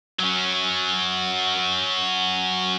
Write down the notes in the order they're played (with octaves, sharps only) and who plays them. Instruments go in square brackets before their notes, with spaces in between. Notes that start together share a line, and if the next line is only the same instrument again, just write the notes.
[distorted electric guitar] F#3 C#4